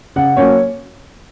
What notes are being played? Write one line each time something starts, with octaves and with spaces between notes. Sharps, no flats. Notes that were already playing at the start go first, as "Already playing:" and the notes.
C#3 F#5
F#3 A#3 C#4 C#5